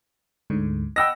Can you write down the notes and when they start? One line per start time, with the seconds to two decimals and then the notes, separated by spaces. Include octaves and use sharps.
0.50 D2 G#2 D3
0.96 D#5 F#5 G5 B5 E6 A#6